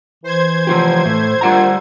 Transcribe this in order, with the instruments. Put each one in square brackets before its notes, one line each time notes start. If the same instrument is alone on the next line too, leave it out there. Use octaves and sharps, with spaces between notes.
[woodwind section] E3 [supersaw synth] C5 G#6
[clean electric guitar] F3 F4 G4
A2
[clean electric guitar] G3 F#5 A#5 [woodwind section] A#3 D4 F4